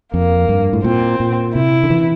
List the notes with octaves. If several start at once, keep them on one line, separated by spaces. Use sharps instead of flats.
F2 A#3
G2
A2
A#2 C4
A#2
C3 E4
D3
E3